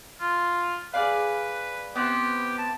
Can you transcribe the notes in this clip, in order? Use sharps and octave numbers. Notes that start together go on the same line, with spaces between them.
F4
G#4 B4 D5 F5
B3 C4 E4 G4
A5